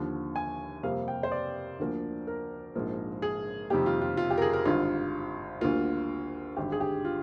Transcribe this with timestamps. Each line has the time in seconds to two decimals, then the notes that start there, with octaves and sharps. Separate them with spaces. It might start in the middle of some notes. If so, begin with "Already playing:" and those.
Already playing: D#2 D3 F3
0.36 G#5
0.83 F2 C3 G3 A#3 F5
1.08 G5
1.23 C5
1.32 D5
1.79 D2 D3 F3 A#3
2.27 A#4
2.75 A#1 G#2 F3 A#3
3.22 G#4
3.70 F2 C3 D#3 G3 A#3 G4
3.86 F4
4.02 F4
4.17 F4
4.30 G4
4.38 A#4
4.42 G#4
4.53 A#4
4.65 G#1 G2 D3 F4
5.61 D2 D3 G3 A#3 F4
6.57 G#1 G2 D3 G4
6.72 G#4
6.80 G4
7.05 F4